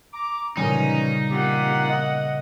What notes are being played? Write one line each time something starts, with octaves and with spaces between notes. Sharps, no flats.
A#5 D6
A#2 C#3 E3 G3 C#4 D#4
A#3 C4 F4 G4 F#5
D#5